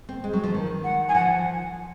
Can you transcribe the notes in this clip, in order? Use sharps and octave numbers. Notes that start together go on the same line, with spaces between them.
C4
G#3
F#3
F3
D#3
F#5
G#5
F3 F#5